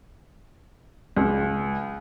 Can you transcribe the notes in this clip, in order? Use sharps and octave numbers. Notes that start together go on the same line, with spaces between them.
C#2